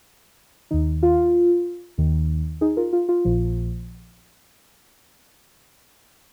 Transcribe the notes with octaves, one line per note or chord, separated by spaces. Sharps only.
D#2 D#3 D#4
F4
D#2 D#3
D#4 G#4
F4 A#4
F4
F4
A#1 A#2 F3